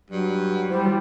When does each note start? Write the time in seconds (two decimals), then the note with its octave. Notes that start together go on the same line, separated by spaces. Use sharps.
0.10 G2 F#3
0.69 G3 E4 C5